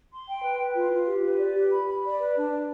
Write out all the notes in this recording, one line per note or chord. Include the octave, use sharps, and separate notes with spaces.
C6
G5
B4
B4
F4
F4
G4
B4
D5
G4
B5
B5
D5
B4
D4
D5